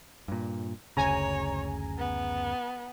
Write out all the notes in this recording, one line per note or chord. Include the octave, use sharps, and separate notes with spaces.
G2 A#2
F#1 D2 C#3 C#5 G#5 A#5
B3